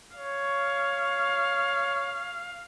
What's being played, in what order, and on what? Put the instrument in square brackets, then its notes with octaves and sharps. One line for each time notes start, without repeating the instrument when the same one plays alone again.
[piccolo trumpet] C#5 [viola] F5